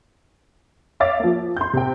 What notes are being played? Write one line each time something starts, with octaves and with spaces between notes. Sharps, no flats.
C#5 E5 F5 D6 A6
F3 A#3
C6 G6
C3 G5